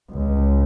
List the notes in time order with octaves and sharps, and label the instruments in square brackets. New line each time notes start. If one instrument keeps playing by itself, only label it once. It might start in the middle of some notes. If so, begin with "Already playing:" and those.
[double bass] C#2